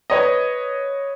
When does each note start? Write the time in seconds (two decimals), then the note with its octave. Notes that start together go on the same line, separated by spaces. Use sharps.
0.10 B4 C#5 D#5